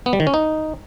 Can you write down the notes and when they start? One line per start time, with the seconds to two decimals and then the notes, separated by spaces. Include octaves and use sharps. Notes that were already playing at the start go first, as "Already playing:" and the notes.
0.06 B3
0.13 G3
0.20 D#3
0.27 C#4
0.34 D#4